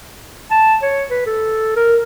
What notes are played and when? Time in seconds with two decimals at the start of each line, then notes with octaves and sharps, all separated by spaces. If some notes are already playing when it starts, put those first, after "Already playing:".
0.51 A5
0.82 C#5
1.10 B4
1.27 A4
1.76 A#4